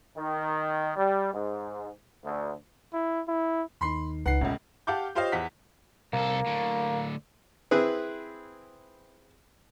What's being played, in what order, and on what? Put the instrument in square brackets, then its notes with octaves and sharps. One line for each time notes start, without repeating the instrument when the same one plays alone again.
[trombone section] D#3
G3
G#2
D2
[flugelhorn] E4
E4
[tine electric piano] D#2 D#3 D#4 [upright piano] B5 C6 C7
[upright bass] C#2 [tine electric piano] D#4 B4 [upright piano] F#5 C7
[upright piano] E1 C#2 [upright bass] A2 [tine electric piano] C#4 E5 F#5
[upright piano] G4 F5 F#5 A5 D6 G6
F4 G4 C5 C#5 D#5 F5
E2 F#5 B6
[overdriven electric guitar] C2 A4 [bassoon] A#3
[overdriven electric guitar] A2 D3
[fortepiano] C4 E4 G#4 B4